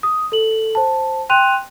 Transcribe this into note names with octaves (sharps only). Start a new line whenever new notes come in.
D#6
A4 F#7
C5 A5
G5 C6 F#6 D#7 F7